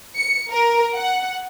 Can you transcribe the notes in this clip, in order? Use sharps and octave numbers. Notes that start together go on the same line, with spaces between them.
C#7
A#4
F#5